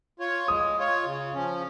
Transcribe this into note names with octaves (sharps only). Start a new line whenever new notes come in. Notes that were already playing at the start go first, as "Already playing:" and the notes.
F4 C#5
G#3 D#6
F4 C#5
C#3
F3 C#4